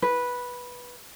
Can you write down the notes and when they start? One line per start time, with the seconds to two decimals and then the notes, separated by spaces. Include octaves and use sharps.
0.02 B4